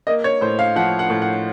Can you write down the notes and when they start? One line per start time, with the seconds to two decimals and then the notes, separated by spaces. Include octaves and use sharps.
0.07 A#3 D#5
0.24 C#5
0.41 A2 C5
0.59 F5
0.76 F3 F#5
0.99 F#5
1.10 A2
1.22 F#5